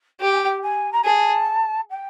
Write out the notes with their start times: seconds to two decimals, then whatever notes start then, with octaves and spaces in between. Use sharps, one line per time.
0.20 G4 G5
0.32 G#5
0.43 G5
0.62 G#5
0.92 A#5
1.04 G#4 A5
1.90 G5